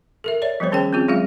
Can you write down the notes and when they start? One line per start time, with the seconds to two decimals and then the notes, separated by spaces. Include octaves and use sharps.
0.24 A4 A#4 E5
0.42 C#5 D5 E5
0.60 F3 G3 B3 C5 C#5
0.72 D#3 C#4 G#4 C5 G5
0.93 C4 C#4 F4 G#4
1.08 F#3 G#3 F4 G#4 F5